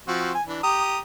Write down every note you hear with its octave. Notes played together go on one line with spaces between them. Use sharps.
F3 C4 F#4
G#5
E3 D4
G4 A#5 D#6